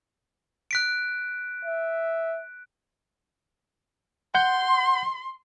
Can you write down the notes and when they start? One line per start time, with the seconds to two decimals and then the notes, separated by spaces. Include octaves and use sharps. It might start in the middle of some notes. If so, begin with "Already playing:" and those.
0.71 F#6 B6 D7
1.65 E5
4.35 F#5 C6 G6